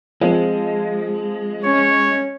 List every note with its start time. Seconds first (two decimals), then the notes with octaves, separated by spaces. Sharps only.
0.21 F3 G#3 C4
1.65 C#4 C#5